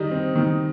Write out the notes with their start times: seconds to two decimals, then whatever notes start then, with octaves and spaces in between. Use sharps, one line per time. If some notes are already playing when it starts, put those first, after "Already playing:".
Already playing: D#3 G3 D#4
0.11 C4
0.35 D#3